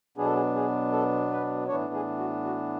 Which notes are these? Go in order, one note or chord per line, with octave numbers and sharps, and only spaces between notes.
B2 F#3 B3 D4 G#4
A4
G#4
G#4
A4
B4
A2 E3 B3 D4 C#5
G#4
F#4
F#4